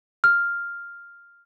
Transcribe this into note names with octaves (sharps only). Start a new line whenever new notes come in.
F6